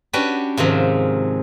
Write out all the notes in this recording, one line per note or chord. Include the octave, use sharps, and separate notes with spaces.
C#4 D4 F#4 G4 B4 D5
G#2 C3 D#3 F3